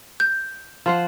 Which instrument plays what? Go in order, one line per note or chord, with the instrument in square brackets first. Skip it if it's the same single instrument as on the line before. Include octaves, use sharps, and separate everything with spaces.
[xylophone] G6
[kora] F3 C5 F#5